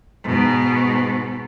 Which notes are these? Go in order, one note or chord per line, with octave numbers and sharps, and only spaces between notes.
G#2 B2